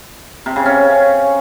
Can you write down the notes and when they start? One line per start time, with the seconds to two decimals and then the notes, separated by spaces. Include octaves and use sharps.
0.46 C3
0.56 C#3
0.66 C#4